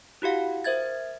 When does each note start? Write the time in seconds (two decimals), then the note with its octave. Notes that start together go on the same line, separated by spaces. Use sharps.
0.22 E4 F#4 G4 F5 F#5
0.64 A#4 C5 E5 G#6 A6